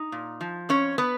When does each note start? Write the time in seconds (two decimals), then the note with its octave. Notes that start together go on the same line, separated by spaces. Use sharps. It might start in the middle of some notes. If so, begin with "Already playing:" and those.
Already playing: D#4
0.12 A#2
0.41 F3
0.69 F2 C#4 C#5
0.98 B3 B4